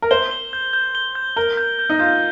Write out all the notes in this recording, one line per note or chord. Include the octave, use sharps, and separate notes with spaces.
A#4
C5 G7
G7
G6
G6
G7
G6
A#4 G7
G6
G6
D#4
F4 G6